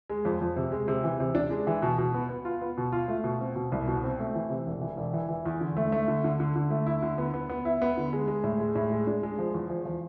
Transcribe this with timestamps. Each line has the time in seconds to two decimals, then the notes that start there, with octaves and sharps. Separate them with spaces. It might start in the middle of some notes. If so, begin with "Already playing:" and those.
0.10 G#3
0.25 F2
0.41 F2
0.56 C3
0.72 G#3
0.88 C3
1.04 E3
1.20 C3
1.35 D4
1.50 G#3
1.67 E3
1.82 B2
1.98 B2
2.14 B3
2.29 B3
2.45 F4
2.61 B3
2.78 B2
2.92 F4
3.08 A3
3.24 B2
3.40 C4
3.56 B2
3.72 C2
3.88 B2
4.04 C4
4.19 A3
4.35 E3
4.50 C3
4.67 E1
4.81 E3
4.97 E1
5.13 E3
5.29 E3
5.45 E2
5.61 D3
5.77 A3
5.92 A3
6.08 D3
6.24 D3
6.40 D3
6.56 D3
6.70 A3
6.86 E4
7.02 D3
7.18 B3
7.34 B3
7.49 B3
7.65 E4
7.82 B3
7.97 D3
8.13 G#3
8.28 G#3
8.44 A2
8.60 G#3
8.75 A2
8.92 G#3
9.07 D4
9.23 G#3
9.39 F3
9.54 E2
9.70 F3
9.86 F3